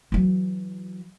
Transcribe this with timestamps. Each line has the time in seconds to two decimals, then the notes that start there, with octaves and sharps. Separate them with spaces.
0.12 E3 F#3